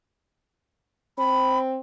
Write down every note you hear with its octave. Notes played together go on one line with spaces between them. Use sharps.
C4 B5